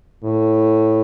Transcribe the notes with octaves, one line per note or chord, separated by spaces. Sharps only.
A2